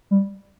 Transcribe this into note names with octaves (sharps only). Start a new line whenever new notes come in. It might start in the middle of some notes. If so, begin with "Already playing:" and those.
G3